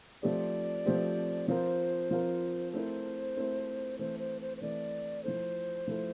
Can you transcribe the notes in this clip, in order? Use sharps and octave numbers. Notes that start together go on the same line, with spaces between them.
F3 A3 C4 G4 C5 D5
F3 A3 C4 G4 C5
F3 C4 F4 A#4 C5
F3 C4 F4 A#4
A3 C4 E4 A#4 C5
A3 C4 E4 A#4
E3 A3 C4 C5
C5
C5
C5
E3 A3 C4 D5
F3 A3 E4 A4 C5
F3 A3 E4 A4